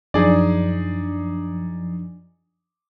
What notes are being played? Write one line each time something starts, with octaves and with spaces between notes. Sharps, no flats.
F#2 F3 D4 D#4 G#4 D5